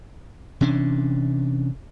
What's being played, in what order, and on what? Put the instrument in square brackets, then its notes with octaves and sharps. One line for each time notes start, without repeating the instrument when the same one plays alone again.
[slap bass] C3 E3 C#4 D4